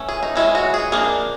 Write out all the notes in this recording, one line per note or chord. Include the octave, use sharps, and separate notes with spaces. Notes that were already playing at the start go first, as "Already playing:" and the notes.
Already playing: E3 A3 C#4
G#4
D#4
E3 G#3 C#4 E4
F#4
G#4
F3 A#3 D4 G#4